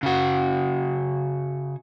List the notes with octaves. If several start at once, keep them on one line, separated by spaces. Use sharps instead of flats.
C#3 F#4